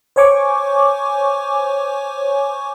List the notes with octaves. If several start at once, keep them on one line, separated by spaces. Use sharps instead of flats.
C5 C#5 G#5 C#6 D6